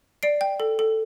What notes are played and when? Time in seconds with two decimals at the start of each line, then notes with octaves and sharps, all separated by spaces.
0.23 D5 C7 D7
0.41 G5
0.60 A4
0.79 A4